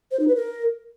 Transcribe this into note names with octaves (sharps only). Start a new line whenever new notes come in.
C5
D#4
B4
A#4